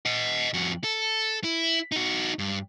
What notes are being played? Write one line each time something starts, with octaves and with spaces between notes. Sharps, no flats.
D#5 F#5
F2 F#4
A4
E4
D#4 F#4
G2